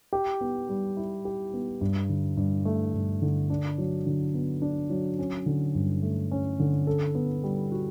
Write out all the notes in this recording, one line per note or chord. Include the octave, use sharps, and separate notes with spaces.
G4
B3
G3
E4
G4
B3
G2
D3
G2
A3
G2
D3
D4
F#3
D3
B3
D4
F#3
C#4
D3
G2
A3
C#4
D3
A4
B3
G3
F#4